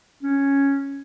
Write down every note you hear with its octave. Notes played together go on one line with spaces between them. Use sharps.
C#4